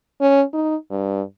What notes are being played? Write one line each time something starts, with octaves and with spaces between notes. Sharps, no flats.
C#4
D#4
G2